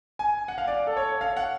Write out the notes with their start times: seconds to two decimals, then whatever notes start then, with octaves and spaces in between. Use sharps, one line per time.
0.19 G#5
0.48 F#5
0.58 F5
0.67 D5
0.87 A4
0.97 C#5
1.21 F5
1.37 F#5